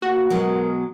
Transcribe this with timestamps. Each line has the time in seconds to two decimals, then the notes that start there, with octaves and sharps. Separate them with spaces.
0.02 A#3 F#4
0.30 B2 F#3 G#3 A#4